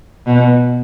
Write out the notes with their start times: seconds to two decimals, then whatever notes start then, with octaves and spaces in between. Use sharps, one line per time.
0.26 B2